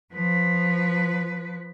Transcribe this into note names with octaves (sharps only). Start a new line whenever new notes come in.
F3 B4